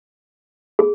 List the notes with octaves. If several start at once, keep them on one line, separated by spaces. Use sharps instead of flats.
G#4